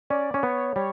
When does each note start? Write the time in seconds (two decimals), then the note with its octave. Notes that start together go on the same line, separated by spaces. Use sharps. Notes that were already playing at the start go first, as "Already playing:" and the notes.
0.10 C#4 D5
0.34 C#4
0.43 B3 C#5
0.76 G3 C#5